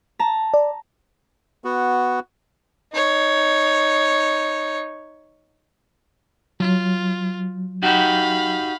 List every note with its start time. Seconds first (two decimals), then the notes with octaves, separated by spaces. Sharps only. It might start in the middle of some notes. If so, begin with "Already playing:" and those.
0.19 A5 A#5
0.54 D5
1.64 B3 F#4
2.93 D#4 C#5
6.60 F#3 F4
7.83 D#4 F#4 G4 F5 B5